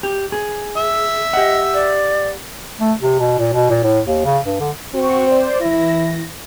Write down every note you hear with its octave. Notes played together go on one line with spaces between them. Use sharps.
G4
G#4
E5
G4 D#5 F#5
D5
A3
C3
B2
A#2
B2
A#2
A2
D#2
C#3
G2
D3
C4 F#4 C#6
C5 D5
E3 E4 A#6